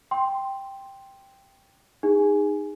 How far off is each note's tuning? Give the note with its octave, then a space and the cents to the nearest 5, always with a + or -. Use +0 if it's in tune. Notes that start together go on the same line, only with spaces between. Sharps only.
G5 +0 C6 +5
D#4 -15 G#4 -25